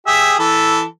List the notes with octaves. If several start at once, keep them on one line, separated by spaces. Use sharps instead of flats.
G4 G#4 E5
E3 A4